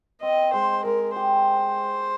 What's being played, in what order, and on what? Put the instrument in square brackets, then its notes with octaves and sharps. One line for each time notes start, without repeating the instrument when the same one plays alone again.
[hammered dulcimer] C4 [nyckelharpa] D#5
[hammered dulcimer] G#3 [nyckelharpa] C5
[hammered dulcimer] G#3 [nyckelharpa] A#4
[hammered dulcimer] G4 [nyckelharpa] C5